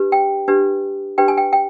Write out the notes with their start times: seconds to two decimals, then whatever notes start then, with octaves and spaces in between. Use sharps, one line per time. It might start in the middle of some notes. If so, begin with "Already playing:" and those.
Already playing: D4 G4 B4
0.12 G5
0.48 D4 G4 B4
1.18 D4 G4 B4 G5
1.28 G#5
1.38 G5
1.53 G5